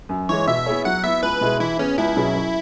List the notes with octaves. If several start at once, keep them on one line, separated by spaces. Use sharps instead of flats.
F#2
E3 G#3 C#5
B2 E5
B3 E4 G#4 C#5
F#3 F#5
B3 E4 E5
C#2 B4
B2 G#3 E4 G#4
E3 E4
B3 C#4 G#4 B4
C#2 E4
B2 F#3 C#4 G#4
F#2